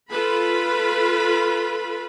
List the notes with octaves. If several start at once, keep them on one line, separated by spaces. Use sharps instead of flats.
F4 A4 B4 B5